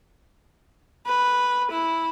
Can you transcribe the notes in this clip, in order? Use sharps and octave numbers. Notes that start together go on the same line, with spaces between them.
B4
E4